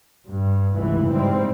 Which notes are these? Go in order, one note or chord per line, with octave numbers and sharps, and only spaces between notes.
G2
F1 C#2 E3
G#2 G3 C4